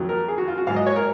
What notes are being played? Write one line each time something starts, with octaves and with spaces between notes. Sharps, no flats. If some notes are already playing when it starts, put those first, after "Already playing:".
Already playing: F2 D#3 F#3
A#4
G#4
F#4
F4
F#4
G#2 F#3 F5
D#5
C#5
A#4